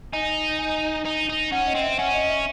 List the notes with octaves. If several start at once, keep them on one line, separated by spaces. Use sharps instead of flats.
D#4 G#5
G#5
D#4
D#4
C#4 F#5
D#5
C4
E5
C#4 F#5
D#5
E5